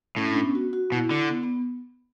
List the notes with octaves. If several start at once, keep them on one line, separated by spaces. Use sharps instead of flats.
A2 C#4
D4
C#4
B3
F#4
F#4
B2 E4
D3
B3
B3